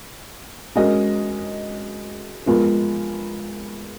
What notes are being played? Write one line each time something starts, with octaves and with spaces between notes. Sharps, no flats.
G#3 C#4 F#4 A#4 D#5
F3 G#3 B3 F4 A#4